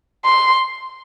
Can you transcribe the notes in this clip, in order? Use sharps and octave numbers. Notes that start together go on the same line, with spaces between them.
C6